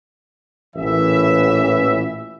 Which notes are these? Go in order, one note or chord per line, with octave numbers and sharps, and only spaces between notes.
A1 A#2 E3 E5